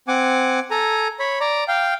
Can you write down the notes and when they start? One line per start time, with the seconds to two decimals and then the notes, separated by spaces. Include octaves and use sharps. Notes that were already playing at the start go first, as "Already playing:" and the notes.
0.08 C4 F#5 G#5 D6
0.71 A4 G#5 A#5
1.19 C#5 B5
1.41 D5 A#5
1.68 F5 G5